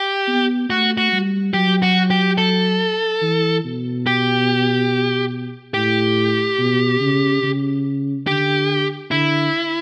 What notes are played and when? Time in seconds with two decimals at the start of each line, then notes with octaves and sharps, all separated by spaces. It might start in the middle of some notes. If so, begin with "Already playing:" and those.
Already playing: G4
0.28 B3
0.70 A3 F#4
0.98 F#4
1.12 G3
1.54 F#3 G4
1.82 F#4
2.10 G4
2.38 A4
3.22 E3
3.65 B2
4.07 G4
5.74 A2 G4
6.58 B2
7.00 C#3
7.43 C#3
8.27 D3 G4
9.11 D3 E4